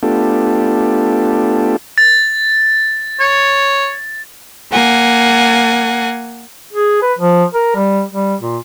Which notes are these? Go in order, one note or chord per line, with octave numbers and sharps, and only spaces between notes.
A3 B3 D4 F4 G4 A4
A6
C#5
A#3 F#5 G#5
G#4
B4
F3
A#4
G3
G3
A#2